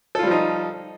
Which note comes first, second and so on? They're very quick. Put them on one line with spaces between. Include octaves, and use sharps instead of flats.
A4 F4 G3 F3 D#4